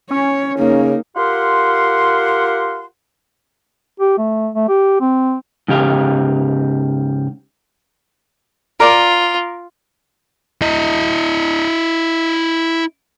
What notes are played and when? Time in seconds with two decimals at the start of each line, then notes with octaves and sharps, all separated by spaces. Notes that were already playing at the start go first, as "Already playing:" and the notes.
0.10 C#4 C#5
0.58 C#3 A#3 D#4
1.16 F4 G4 A#4 F#5 C6
4.00 G4
4.18 A3
4.55 A3
4.68 G4
5.00 C4
5.68 G#2 C#3 G4 F5
8.80 F4 A#4 D5
10.62 E4 D#5